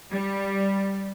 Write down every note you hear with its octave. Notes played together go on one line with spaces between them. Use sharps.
G3